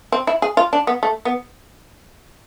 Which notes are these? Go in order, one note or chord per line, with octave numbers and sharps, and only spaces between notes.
C4
E4
G#4
F4
D4
B3
A3
B3